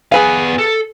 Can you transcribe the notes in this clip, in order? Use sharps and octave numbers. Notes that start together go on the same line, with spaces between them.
B3 G#4 B4 F5 G#5
A4